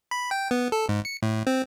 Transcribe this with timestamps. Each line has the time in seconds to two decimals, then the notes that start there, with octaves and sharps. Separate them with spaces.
0.11 B5
0.31 G5
0.51 B3
0.72 A4
0.89 G#2
1.05 C#7
1.22 A2
1.47 C4